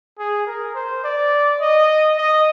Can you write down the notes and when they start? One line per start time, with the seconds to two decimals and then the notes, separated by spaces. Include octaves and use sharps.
0.19 G#4
0.47 A#4
0.75 C5
1.04 D5
1.61 D#5
2.18 D#5